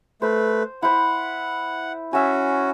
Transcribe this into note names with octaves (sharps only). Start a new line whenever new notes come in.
A3 B4 C5
E4 C5 F#5
C#4 F#4 E5 G#5